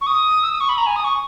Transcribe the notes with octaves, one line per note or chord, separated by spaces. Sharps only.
C#6
D#6
E6
D#6
C#6
B5
A#5
G#5
D#6
C#6